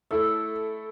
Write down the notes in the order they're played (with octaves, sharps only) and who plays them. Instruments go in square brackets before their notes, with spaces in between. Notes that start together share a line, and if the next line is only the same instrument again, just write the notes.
[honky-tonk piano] A3 E4 A4 [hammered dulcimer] E5